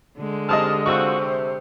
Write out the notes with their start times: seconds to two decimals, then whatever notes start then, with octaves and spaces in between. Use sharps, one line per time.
0.18 D3 G#3
0.49 G#2 C4 G4 D#5 A5 D#6 F6
0.86 C3 F4 F#4 C5 C#6 E6
1.20 C3